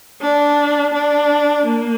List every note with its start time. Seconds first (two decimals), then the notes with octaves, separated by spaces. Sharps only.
0.21 D4
0.93 D4
1.65 A#3